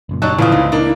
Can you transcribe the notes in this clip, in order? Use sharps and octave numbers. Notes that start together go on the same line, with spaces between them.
F#1 F#2 A#2
F#3 G3 D#4 A5 F#6
G1 A2 C#3 E3 F3 E4 F4 D#6
C#2 D#4
A#3 D4 D#4